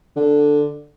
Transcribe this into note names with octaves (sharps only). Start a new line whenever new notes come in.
D3